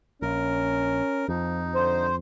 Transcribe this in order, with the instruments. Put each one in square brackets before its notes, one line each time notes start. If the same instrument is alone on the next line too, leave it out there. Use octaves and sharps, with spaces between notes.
[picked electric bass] A#1 [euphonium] C#4 [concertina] A#4
[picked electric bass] F2 [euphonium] F3 [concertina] D#4
[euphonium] D3 [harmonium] C5